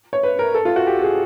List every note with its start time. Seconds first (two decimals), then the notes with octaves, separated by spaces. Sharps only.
0.13 C#5
0.23 B4
0.39 A#4
0.55 A4
0.65 F4
0.76 F#4
0.87 G4
1.02 G#4